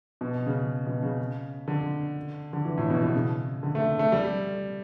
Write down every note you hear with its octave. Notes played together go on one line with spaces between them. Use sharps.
B2
C#3
B2
C#3
D3
D3
E3
A2
B2
B2
C#3
D3
A3
A3
G3